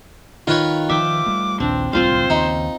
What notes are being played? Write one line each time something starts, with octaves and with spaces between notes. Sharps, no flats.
D#3 F4 B4 C#5
D#3 F3 E5 G5 D6
G3 A3
A#1 D#2 C4 D4
D1 C2 G3 C4 F4 C5 F5
D#2 C#3 D#4